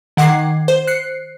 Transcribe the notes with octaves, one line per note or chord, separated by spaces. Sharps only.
D#3 F#5 D6 G#6 C7
C5
F#6 C7 C#7